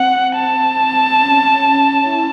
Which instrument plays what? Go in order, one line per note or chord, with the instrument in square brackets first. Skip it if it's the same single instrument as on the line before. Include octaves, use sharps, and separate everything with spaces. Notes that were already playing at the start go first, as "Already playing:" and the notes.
Already playing: [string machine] C4 [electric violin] F#5
[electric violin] A5
[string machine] C#4
E4